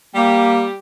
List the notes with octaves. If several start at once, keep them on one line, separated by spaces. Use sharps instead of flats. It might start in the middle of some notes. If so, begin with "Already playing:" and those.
G3 A#3 G4